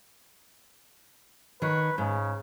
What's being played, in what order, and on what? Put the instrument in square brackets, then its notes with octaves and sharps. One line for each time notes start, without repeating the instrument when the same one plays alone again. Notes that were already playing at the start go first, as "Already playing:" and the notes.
[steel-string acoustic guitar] D#3 C#5 [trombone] B4
[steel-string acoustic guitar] G#2 [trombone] C#3